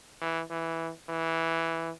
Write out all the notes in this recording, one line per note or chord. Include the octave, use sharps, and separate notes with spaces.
E3
E3
E3